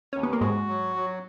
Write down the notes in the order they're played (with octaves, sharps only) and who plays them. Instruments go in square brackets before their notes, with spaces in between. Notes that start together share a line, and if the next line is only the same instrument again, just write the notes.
[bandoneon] D#2 [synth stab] C#4
[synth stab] B3
A#3
[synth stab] G#2 G#3 [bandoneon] F#4
[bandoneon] F#3
F#3